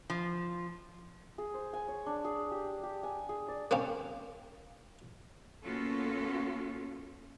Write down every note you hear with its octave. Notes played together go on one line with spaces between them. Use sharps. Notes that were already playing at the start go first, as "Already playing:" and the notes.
F3
G#4
C5
G#5
C#5
D4
G#4
G4
G4
G#5
G#4
D5
A#3 C4 C#4
A#3 B3 C#4 F4 F#4 A4